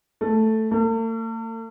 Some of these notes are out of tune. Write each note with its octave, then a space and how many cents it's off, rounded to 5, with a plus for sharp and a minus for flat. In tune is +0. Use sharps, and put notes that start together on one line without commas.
A3 +0
A3 +45